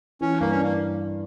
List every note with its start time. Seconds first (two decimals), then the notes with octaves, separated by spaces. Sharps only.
0.21 E3 C#4
0.40 G2 A#3
0.51 C#4
0.60 A#3 D4